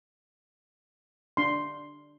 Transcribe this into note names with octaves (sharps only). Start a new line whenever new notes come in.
D4 C6